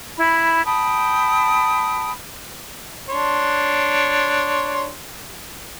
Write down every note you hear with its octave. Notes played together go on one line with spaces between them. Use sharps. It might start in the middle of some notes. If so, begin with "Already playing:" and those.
E4 B5
G5 A5 B5 D#6
D4 C#5 C6